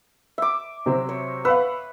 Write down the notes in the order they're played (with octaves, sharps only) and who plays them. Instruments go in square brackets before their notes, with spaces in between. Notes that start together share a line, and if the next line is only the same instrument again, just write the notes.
[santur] E5 D6
[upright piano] C3 F#3 C4
[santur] C#5
[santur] B4 [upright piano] F5 F#5 E6